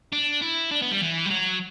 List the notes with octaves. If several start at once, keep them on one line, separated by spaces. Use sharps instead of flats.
D4
E4
D4
B3
G3
E3
G3
F#3